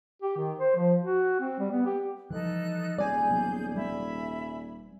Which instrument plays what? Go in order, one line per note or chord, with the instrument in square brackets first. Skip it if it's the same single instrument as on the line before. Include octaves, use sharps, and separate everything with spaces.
[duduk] G4
D#3
C5
F3
F#4
C4
G3
B3
G4
[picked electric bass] E3 F3 G3 [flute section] D#4 A4 F#6
[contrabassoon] D#1 [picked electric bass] G3 C4 [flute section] G#4 G6 [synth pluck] D5 G#5
[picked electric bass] F#3 G3 B3
[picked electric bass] G3 C4 [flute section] E5 B5